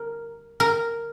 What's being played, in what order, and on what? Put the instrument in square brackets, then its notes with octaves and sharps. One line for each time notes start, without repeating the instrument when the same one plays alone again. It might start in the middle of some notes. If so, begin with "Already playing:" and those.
Already playing: [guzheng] A#4
A#4